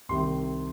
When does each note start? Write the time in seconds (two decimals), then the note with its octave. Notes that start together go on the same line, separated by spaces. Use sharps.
0.09 C2 C3 D#3 C6